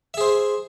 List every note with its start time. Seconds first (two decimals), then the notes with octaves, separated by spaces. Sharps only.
0.14 E5
0.17 G#4
0.21 C5